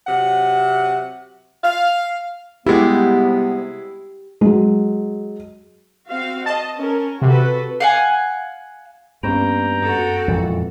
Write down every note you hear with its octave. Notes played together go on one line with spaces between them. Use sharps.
C3 F#3 F#5
F5
C3 G3 G#3 B3 E4 G4
F#3 G#3
C4 F#4 F5
D#5 A5
C#4 A#4
C3 F#4 A4 B4
F5 F#5 G#5
G2 A#3 B3 C#4 G5 A#5
F#2 F#4 A4
F2 A#2 E3 G#3